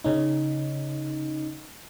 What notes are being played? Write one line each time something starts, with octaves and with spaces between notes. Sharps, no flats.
C#3 C#4 D#4